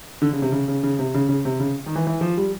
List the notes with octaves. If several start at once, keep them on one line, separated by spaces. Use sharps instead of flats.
D3
C#3
C3
C#3
C#3
C#3
C3
C#3
C#3
C3
C#3
D#3
E3
E3
F3
G3